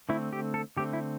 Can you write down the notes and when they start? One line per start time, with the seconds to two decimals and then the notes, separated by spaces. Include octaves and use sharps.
0.09 D3 A3 C4 E4
0.33 G4
0.54 A4
0.77 D3 A3 C4 G4
0.93 E4